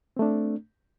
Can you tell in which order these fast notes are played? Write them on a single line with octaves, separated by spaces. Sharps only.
C4 A3 D4